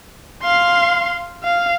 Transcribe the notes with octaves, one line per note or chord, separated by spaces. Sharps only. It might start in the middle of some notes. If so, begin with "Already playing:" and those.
F5 C6
F5